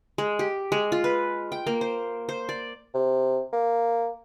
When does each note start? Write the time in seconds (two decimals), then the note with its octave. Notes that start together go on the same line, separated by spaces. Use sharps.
0.18 G#3
0.39 G4
0.72 G#3
0.92 F4
1.04 B4
1.52 G5
1.67 A#3
1.81 C5
2.29 C5
2.49 D5
2.94 C3
3.53 A#3